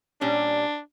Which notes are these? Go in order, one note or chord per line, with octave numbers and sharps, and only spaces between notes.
A#2 G3 C#4 D4